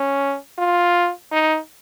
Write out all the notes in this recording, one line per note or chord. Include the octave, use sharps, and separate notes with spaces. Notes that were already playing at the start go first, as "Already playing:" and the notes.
Already playing: C#4
F4
D#4